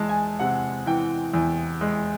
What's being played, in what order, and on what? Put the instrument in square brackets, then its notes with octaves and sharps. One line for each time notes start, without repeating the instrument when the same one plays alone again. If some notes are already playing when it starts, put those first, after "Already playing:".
Already playing: [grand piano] E2 G#3 A5
G#5
C3 F#5
E3 G5
E2
G#3